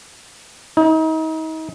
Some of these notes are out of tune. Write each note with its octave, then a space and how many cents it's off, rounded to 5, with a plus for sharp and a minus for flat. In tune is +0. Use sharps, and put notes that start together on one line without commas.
D#4 +35